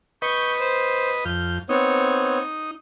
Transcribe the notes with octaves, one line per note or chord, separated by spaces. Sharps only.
B4 D#5 C#6 G6
C5
F2 F6 G6
B3 C4 D#4 C#5